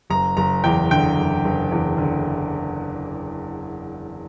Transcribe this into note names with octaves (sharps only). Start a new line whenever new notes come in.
F#1 A#5
F#1 A#5
E2 G5
D3 G5
F#1
F#1
E2
D3